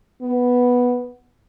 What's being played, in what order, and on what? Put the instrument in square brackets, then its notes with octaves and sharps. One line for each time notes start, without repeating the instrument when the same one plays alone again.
[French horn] B3